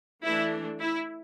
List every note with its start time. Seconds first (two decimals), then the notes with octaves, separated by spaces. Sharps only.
0.24 E3 A3 D4 E4
0.80 E4